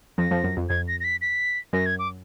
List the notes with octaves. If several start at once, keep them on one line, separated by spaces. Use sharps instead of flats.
F2 F3 A#6
F2 F3
F#2
F2
F2 G#6
A#6
A#6
B6
B6
F#2 A#6
G#6
D6